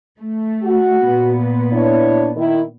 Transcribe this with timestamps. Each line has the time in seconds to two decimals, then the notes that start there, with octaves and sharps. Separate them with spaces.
0.20 A3
0.63 F#4
1.06 A#2 B3
1.73 D4 E4 C#5
2.35 D#3 E4